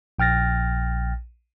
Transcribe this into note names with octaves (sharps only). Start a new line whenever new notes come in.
A#1 G5 F6 A6 A#6